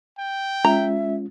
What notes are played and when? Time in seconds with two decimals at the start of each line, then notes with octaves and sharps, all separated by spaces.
0.18 G5
0.65 G#3 C#4 F4 E5 A#5